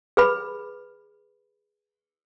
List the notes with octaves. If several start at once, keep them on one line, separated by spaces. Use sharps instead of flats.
G#4 B4 B5